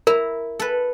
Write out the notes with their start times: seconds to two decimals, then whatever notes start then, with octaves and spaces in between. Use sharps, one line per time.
0.07 E4 A#4 A#5
0.60 A4 B4